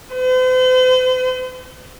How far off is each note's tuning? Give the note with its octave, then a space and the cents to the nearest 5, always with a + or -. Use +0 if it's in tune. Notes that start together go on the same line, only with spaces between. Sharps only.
C5 -45